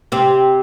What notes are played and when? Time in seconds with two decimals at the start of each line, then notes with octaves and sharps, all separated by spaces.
0.12 C3 C4